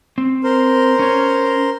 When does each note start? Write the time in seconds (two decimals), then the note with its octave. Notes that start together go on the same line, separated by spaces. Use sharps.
0.18 C4
0.44 A#4 C5
0.99 C#4 C#5